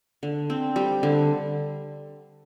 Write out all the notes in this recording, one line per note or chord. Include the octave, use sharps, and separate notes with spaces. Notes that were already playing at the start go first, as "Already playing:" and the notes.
D3
C4
G3
D3